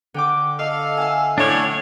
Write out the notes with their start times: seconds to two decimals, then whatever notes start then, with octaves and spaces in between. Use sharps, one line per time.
0.14 D3 G5 D6
0.59 A4 D#5 F5
0.97 E5 F#5 G#5
1.38 A2 D4 C#5